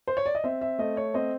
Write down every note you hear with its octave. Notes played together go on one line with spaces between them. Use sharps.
C5
C#5
D5
D#5
C4 E5
E5
A3 D#5
C#5
C4 D#5